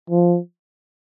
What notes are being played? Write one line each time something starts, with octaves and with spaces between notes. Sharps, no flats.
F3